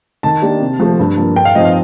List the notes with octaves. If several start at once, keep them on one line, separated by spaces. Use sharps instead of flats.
D#3 A5
A#3 D4 G4
C3
F3 A3 C4
G2
F3 A#3
G2 G5
F5
F3 C4 D#4 D#5
F5